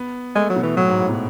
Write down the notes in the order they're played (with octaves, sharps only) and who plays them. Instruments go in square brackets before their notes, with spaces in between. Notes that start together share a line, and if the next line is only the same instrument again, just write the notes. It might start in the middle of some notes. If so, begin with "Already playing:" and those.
Already playing: [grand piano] B3
[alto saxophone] G#3 [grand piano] A3
[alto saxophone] F#3
[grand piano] B2
[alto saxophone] E3
[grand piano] A2 [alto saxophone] F#3
[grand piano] G#2
A2
B2